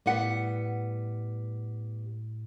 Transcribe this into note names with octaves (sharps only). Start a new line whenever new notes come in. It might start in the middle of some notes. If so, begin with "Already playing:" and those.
A2 G3 B3 F#5 B6